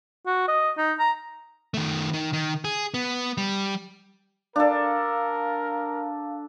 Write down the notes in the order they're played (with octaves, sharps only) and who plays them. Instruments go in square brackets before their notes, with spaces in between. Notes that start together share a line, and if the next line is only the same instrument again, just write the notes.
[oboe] F#4
D#5
D#4
A#5
[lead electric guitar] D#3 A3
D#3
D#3
G#4
B3
G3
[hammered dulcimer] D4 A4 [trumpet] A#4 [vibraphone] F5